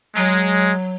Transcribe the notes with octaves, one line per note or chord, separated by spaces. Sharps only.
F#3 G#3